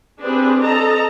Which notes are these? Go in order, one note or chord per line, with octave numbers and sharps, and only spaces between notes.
C4 D4 G4 G#4 B4
A4 D#5 A5 A#5